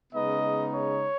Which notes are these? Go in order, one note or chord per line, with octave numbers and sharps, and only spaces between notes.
C#3 G#3 B3 D#4 D#5
C#5